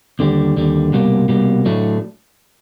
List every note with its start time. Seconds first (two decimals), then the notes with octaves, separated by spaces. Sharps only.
0.19 D#2 D3 G3
0.56 D#2 D3 G3
0.93 C2 B2 G3 A#3
1.29 C2 B2 G3 A#3
1.66 A2 F#3 A3 D4